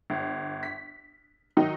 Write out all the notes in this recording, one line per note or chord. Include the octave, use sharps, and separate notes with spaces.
G1
B6
D#3 F#3 D#4